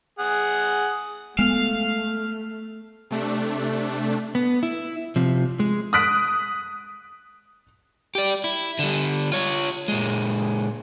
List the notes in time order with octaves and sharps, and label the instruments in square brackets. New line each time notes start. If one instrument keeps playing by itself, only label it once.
[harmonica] G#4 F#5
[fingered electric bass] G#3 [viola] A3 [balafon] B3 [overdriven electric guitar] F5
[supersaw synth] C3 A3 D4
[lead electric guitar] B3
E4
C3 F3
G#3
[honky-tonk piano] D#6 F#6 B6 D7
[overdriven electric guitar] G4 D5
E4
D3 G3
F4 C#5
A#2 G#3